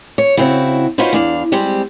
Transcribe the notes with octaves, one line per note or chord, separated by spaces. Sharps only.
C#5
C#3 C4 E4 F#4
C#4 D#4 F4 F#4 B4 C5
E2 D4 F5
G3 G#3 C4 G4 C5